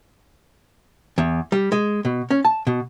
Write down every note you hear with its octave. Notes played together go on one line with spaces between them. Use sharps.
E2
G3
G#3
B2
C#4
A5
B2